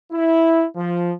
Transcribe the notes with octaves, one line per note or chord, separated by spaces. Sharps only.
E4
F3